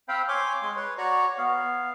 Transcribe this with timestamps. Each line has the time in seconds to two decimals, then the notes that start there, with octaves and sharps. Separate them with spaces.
0.09 C4 C5 F5 G5 B5
0.28 C#5 G#5 C6 D6
0.62 G#3 C6
0.77 B4 C#5
0.98 F#4 C#5 D5 A#5 C#6
1.38 B3 F5